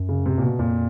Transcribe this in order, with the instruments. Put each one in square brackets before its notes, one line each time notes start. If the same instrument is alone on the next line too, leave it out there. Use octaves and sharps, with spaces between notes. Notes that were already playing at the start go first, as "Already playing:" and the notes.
Already playing: [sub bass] F#2
[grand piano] C#3
C3
A#2
B2
[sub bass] F2 [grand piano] A#2